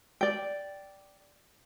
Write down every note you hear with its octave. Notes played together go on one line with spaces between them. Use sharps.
D5 G5